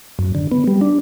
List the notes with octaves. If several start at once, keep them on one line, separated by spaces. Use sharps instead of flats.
F#2
D3
B3
G3
D4